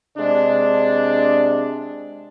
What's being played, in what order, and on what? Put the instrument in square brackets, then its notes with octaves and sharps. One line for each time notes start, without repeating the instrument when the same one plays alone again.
[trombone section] C3 G#3 D4